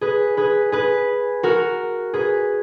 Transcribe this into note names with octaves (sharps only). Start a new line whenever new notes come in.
G#4 B4
G#4 B4
G#4 B4
F#4 A#4
G#4 B4